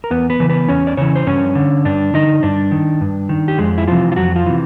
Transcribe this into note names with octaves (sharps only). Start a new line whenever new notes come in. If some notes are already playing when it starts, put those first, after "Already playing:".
A#4
E2 B3 B4
B3 B4
C#3 E3
B3 B4
E2 C#4 C#5
D5
C#3 E3 C#4 C#5
C5
G2 C#4 C#5
D3
G2 D4 D5
D3 D#4 D#5
G2 D4 D5
D#3
G2
D#3
G4
F2 G#3 G#4
E4
C3 E3 F3 F4
F4
F2 F#3 F#4
F3 F4
C3 E3